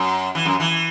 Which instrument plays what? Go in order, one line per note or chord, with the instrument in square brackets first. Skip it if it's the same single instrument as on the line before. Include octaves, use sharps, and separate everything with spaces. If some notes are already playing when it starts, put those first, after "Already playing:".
Already playing: [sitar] F#2
E3
F#2
E3